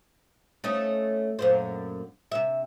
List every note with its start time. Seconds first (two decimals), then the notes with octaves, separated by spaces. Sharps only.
0.64 A3 C#4 D#4
1.39 F#2 A#2 C5
2.32 C3 E5